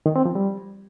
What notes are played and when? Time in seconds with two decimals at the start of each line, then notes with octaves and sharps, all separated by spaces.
0.06 D#3
0.16 C4
0.25 F3
0.35 G3